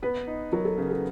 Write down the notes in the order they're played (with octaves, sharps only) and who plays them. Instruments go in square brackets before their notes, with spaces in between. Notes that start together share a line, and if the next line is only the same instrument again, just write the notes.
[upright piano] B3 [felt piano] B4
[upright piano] D#4
[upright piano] F#3 [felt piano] A#4
[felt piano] A4
[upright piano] C#3 [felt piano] A#4
[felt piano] A4